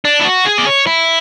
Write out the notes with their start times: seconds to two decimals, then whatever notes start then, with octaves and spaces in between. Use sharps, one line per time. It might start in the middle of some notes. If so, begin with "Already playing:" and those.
0.05 D4
0.20 E4
0.25 F#4
0.45 G#4
0.58 D5
0.66 C#5
0.87 E4